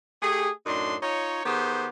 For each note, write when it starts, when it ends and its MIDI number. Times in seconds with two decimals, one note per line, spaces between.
0.22 0.49 57
0.22 0.49 67
0.22 0.49 68
0.66 0.95 42
0.66 0.95 45
0.66 0.95 62
0.66 0.95 63
0.66 0.95 84
1.02 1.43 63
1.02 1.43 65
1.02 1.43 73
1.45 1.88 51
1.45 1.88 59
1.45 1.88 67
1.45 1.88 68
1.45 1.88 72